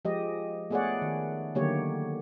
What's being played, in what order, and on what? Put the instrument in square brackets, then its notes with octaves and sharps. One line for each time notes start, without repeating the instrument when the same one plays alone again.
[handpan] F3 G#3 G4 D#5
A3 B3 G#4 C#5 D5 F#5
D#3
D3 D#3 F#3 A#3 G4 C#5